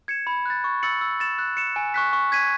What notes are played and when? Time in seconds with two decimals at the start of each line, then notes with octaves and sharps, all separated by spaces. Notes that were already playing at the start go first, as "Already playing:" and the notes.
0.08 G#6 C#7 E7
0.27 B5
0.46 F#6 A6
0.64 C#6
0.83 E6 A6 C#7 F#7
1.01 E6
1.20 A6 E7
1.39 F#6
1.57 C#7 E7
1.76 G#5
1.94 C#6 F#6 B6
2.13 C#6
2.32 G#6 B6 D#7